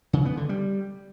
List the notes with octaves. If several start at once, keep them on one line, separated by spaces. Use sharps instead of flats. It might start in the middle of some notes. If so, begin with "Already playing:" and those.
C#3
B3
D3
G3